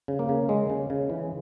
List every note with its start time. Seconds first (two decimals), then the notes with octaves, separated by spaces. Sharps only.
0.08 C#3
0.19 A#3
0.29 C#3
0.49 G#3
0.70 C#3
0.90 C#3
1.10 E3